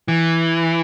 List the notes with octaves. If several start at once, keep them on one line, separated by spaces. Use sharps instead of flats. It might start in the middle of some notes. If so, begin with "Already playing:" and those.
E3